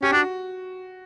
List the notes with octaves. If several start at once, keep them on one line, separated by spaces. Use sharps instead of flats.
C#4 G4
D4 F#4